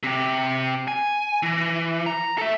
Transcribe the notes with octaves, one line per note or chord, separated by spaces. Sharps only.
C3 G4
G#5
E3
A#5
A4 E5